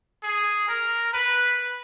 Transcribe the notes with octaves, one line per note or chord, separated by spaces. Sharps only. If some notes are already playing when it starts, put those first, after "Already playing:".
G#4
A#4
B4